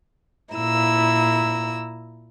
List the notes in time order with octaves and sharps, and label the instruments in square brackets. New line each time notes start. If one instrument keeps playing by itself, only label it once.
[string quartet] A#2 E4 A#5 E6